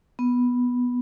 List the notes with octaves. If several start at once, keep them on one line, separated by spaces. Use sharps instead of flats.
B3